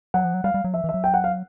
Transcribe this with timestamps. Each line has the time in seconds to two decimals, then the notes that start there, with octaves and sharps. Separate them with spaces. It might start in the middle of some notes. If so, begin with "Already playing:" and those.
0.14 F#3 F#5
0.24 F3
0.34 F#3
0.44 G3 F5
0.54 G3
0.64 F#3
0.74 F3 E5
0.84 E3
0.89 E5
0.94 F#3
1.04 G5
1.14 F#5
1.24 F5